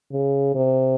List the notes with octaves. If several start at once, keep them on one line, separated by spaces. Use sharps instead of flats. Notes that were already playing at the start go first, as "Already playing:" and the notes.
C#3
C3